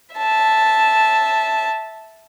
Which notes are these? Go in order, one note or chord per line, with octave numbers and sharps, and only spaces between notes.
E5 A5